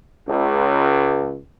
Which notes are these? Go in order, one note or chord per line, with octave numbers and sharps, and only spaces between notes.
C#2